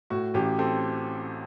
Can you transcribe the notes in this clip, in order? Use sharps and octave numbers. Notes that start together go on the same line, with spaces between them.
A2 F#4
A1 G4
C4 A4